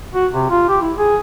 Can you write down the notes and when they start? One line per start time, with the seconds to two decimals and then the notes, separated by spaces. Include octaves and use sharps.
0.14 F#4
0.33 C3
0.50 F4
0.69 G4
0.82 E4
0.98 G#4